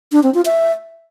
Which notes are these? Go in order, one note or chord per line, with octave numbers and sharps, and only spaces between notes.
D4
C4
F4
E5